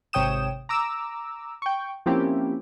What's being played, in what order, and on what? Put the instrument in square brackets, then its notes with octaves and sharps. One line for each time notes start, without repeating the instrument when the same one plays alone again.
[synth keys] G#1 C3 C#5 G5 D#6 E7
A#5 D6 E6
G5 C#6
F3 A#3 C4 C#4 E4 G4